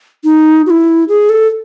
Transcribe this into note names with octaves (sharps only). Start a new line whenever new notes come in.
D#4
F#4
E4
G#4
A4